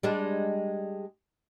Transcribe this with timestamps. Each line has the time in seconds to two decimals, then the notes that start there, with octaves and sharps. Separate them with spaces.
0.03 G3 G#3 D4